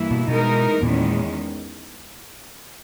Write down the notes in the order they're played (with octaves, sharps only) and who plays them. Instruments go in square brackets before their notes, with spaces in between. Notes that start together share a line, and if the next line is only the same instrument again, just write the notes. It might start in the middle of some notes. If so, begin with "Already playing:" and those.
Already playing: [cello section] G2 E3 A#3 E4
[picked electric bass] B2
[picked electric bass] B2 [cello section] E3 G#3 D#4 A#4
[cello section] E2 D#3 G#3 C#4 [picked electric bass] A#2